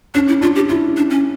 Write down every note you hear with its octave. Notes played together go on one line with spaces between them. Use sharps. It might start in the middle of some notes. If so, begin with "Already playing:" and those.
C#4 D4
E4
D4 F4
G4
E4 F4
D4
C#4